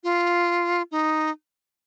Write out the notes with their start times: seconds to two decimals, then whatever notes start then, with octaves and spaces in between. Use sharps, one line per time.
0.04 F4
0.92 D#4